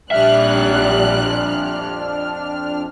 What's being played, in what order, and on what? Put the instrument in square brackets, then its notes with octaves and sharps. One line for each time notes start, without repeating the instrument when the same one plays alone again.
[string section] A#1 G3 F#6 [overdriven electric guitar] F2 E5 [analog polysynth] D4 F6